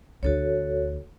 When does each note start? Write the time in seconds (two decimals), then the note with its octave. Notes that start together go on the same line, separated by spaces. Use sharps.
0.23 D2 D4 F#4 A4 C#5